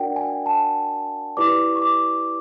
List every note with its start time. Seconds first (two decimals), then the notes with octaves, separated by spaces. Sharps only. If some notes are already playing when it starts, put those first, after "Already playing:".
Already playing: D4 F#4 A#4 D5 F#5 G5
0.16 G#5
0.46 A5
1.37 E4 G4 B4 D5 D6
1.76 C#6
1.82 D6